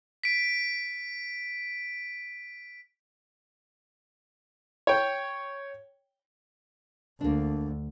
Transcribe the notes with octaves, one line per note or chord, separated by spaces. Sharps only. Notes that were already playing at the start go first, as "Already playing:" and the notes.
B6 D7
C#5 G5
D2 A#3 D4